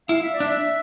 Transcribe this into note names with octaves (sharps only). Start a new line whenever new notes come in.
E4 F5
E5
D5
D4
E5